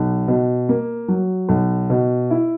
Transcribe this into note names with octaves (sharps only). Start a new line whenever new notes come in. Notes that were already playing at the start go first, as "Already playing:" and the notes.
Already playing: B1
B2
A#3
F#3
B1
B2
E4